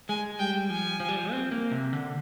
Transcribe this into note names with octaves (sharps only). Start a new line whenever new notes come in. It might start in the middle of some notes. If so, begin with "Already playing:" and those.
G#3 G#5
G3 G5
F3 G#5
F3
G3
F3
C4
A#3
C3
D3